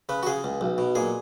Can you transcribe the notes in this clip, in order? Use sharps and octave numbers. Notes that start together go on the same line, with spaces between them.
C#3 B4
F#4
C#3 G#4
C#2
B1
B2
A#2 G#4